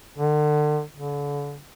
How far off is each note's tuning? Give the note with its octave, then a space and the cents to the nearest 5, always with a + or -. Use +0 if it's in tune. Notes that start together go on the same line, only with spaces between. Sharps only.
D3 +35
D3 -35